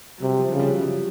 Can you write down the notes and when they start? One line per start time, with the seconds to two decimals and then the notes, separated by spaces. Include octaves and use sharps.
0.18 F#3
0.22 C3 G3
0.38 F3
0.52 C#3 F3
0.60 G3
0.67 F#3
0.81 G3